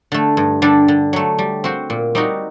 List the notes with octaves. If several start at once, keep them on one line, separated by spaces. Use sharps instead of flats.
D3 A3
G2
D3 G3 D4 A4
D3
F#3 A3
G3
C4 F#4 C5
A#2
G3 C4 D#4 F#4